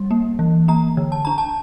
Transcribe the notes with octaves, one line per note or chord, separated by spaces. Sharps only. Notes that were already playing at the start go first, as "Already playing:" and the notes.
Already playing: G3
A#3
E3
A#3 A#5
D3
A5
D4 A#5
A5